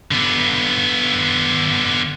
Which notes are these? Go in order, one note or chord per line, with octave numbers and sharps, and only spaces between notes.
D3 B3